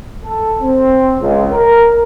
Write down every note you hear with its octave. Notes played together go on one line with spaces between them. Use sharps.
A4
C4
C#2
A#4